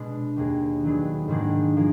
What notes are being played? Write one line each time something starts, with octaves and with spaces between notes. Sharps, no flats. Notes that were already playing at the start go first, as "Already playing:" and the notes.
Already playing: B2 G#3 D4
D#2 D#3 A#3 D4 G#4
D#3 F#3 B3 D4 G#4
G#2 D#3 A#3 D4 G#4
F3 A#3 G#4